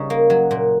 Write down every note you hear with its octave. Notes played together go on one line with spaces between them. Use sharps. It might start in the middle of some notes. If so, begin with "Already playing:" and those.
Already playing: C#3 G3 D#4
A#3
F#3
A#2